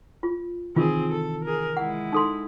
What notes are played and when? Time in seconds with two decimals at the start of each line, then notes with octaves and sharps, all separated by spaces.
0.23 F4
0.76 C3 D#3 E3 C4 F4 G#4
1.11 A4
1.44 G#4 A#4
1.77 G#3 E4 F#5
2.12 D#4 A4 C6